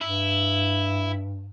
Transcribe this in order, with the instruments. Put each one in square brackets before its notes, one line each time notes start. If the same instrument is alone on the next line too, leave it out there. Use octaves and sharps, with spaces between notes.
[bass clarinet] G2 [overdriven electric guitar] E4